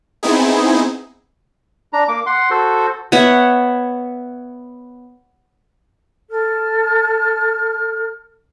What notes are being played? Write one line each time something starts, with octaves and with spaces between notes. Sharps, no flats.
B3 C4 D#4 E4 G#4
D4 A#5
A#3 D6
F#5 C6
F#4 A4 C5
B3 C#5 E5 F#5
A4 F6